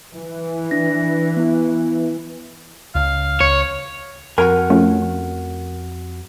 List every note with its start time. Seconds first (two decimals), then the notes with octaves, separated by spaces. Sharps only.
0.13 E3
0.71 D4 A#6
1.37 B3 E4
2.95 C#2 F5
3.40 C#2 C#5
4.38 F2 F#4 A#4 F#5 G#5
4.70 F3 A3 C#4